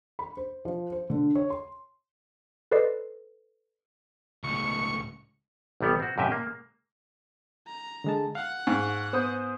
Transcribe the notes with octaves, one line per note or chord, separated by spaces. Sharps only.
B5
C5
F3
C5
D3
C#5
C6
A4 B4 C5 D5 D#5 C7
C#2 A2 C#6
A1 C3 G3 B3 C#5
C4 F#4
F#2 A2 C3 G4 D#5 E5
A#3
A#5
D3 G#3 A5
F5 F#5
G#2 F5 C#6
B3 C5 D#6 G6